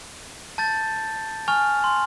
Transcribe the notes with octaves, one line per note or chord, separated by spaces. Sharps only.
A5 G6 A6
G#5 C#6 F6 F7
C6